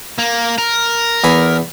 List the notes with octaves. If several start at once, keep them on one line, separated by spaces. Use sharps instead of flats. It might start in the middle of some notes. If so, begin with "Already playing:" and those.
A#3
A#4
E2 G#5 B5